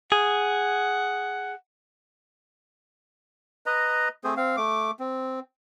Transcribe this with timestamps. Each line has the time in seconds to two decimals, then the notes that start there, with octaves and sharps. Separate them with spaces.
0.12 G#4 F#5
3.66 B4 D#5 A#5
4.24 A3 C4 G#4 C5
4.37 C4 F5
4.57 A3 D6
4.99 C4